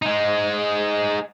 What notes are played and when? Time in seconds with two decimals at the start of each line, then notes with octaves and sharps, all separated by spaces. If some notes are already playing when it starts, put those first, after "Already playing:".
0.02 G#3 D#4